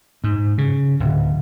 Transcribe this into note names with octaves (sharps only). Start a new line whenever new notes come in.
G#2
C#3
D1